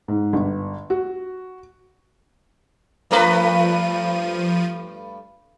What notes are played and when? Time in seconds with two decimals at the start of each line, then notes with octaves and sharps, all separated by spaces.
0.08 G#2
0.33 G1
0.90 F#4
3.11 G2 F3 A3 B4 D#7